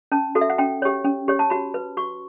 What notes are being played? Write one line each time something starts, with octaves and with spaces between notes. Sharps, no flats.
C#4 A5
F#4 A4
E5
F#5
C#4 G5
G4 C#5
C#4
G4 C#5
A5
F#4 B5
B4
F#4 C#6